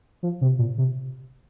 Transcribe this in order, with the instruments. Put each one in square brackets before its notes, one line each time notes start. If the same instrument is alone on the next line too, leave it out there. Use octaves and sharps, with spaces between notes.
[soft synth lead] F3
C3
A#2
C3